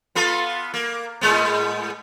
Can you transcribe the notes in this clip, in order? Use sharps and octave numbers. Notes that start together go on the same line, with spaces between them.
B3 F4 A4
A#3
A2 G#3 B3